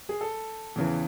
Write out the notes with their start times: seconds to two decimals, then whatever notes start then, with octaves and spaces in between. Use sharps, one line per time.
0.09 G#4
0.21 A4
0.76 E2 C#3 E3